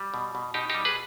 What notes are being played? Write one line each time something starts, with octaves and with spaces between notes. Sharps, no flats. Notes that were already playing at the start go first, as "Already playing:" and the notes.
Already playing: G3
B2
B2
B2 D#4 G4
G3 D#4 G4
G#4 B4